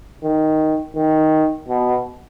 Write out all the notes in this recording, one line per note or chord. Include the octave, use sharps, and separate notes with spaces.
D#3
D#3
B2